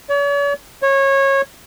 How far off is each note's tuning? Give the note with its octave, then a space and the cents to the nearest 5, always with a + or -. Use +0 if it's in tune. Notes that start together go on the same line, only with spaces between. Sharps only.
C#5 +45
C#5 -20